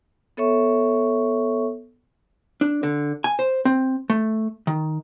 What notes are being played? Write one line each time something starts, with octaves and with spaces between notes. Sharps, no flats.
B3 A4 C#5 E5 C#6
D4
D3
G#5
C5
C4
A3
D#3